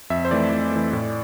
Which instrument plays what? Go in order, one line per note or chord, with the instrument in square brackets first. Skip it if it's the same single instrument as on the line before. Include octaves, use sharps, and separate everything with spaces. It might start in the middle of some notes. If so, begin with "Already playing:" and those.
[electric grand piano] F2 E5
C5
E3 A3 D5
F2
E3 A3
A2